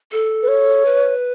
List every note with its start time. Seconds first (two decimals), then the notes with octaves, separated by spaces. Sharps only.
0.12 A4
0.43 B4
0.48 C#5
0.85 B4